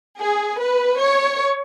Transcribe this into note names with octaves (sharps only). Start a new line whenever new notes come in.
G#4
B4
C#5